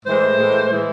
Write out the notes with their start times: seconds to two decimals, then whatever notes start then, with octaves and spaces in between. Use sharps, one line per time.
0.05 A2 E3 G#3 C5
0.38 A2 E3 G#3
0.70 A2 E3 G#3